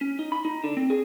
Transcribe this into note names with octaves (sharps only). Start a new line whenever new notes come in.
C#4
D#4
B5
D#4
D3
C4
G#4